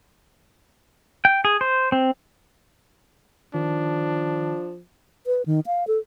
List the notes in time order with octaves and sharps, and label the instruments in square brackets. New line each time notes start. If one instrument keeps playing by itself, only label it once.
[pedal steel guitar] G5
G#4
C5
C4
[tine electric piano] D#3 [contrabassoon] F3 [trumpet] D4
[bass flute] B4
D#3
F5
A4